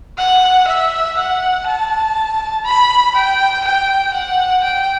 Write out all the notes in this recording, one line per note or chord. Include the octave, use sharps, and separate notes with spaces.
F#5
E5
F#5
A5
B5
G5
G5
F#5
G5